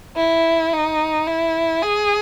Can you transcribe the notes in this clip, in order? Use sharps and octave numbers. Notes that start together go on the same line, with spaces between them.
E4
D#4
E4
G#4